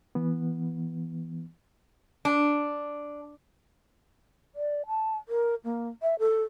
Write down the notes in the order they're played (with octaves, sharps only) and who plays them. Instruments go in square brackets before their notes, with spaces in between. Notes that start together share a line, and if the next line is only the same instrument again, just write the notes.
[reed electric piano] E3 B3
[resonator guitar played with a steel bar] D4
[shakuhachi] D5
A5
A#4
A#3
E5
A4